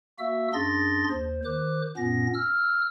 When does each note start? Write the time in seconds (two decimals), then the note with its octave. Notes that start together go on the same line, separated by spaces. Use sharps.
0.19 A#3 F#4 E5 E6
0.53 F#2 D4 G#4 C6 A6 A#6
1.10 D#2 C5
1.45 D#3 C5 D6 F#6
1.97 F#2 A#2 B3 C#4 A#6
2.34 E6 F6